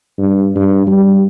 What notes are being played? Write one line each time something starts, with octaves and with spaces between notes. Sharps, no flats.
G2
G2
G3